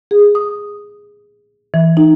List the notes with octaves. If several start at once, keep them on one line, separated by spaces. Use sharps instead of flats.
G#4
D#6
E3
D#4